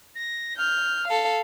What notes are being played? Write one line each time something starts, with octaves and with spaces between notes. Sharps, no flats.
A#6
F6 G6
A4 F5